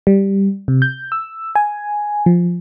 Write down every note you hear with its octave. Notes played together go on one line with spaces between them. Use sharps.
G3
C3
G6
E6
G#5
F3